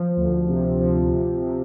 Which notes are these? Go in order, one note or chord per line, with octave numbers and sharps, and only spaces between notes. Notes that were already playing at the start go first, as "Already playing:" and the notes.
Already playing: F3
D2
C3
F3
C3
C3